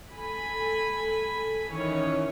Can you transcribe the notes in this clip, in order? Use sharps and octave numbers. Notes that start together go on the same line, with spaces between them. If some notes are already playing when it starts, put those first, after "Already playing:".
A4 G#5 B5
D#3 E3 C#4 C#5